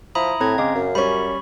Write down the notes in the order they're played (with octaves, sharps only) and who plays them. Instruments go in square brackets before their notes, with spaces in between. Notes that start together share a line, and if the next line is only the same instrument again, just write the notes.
[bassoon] F3 [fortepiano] E4 [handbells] A#5 B5 D#6
[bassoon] A2 [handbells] C4 A#5 G#6
[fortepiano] C#3 D6 [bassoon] G#3 [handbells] F5
[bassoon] F#2
[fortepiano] G3 C#4 [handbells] B5 C#6